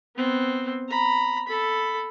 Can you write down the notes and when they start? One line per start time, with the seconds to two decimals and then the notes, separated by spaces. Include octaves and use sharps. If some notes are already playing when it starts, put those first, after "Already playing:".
0.16 B3 C4
0.89 A#5 B5
1.48 A4 B5